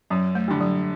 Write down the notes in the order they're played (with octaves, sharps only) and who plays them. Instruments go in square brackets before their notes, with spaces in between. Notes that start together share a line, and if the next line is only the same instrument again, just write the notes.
[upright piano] F#2 [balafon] F#3
[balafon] A3
[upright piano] D3 G3
[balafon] F#3